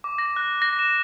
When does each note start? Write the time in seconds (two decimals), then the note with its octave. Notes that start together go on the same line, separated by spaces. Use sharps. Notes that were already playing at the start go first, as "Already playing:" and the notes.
0.04 D6
0.18 A#6
0.36 F#6
0.62 A#6
0.79 E7